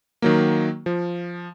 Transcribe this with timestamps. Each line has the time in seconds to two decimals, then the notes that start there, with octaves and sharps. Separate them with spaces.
0.22 D#3 F#3 A#3
0.86 F3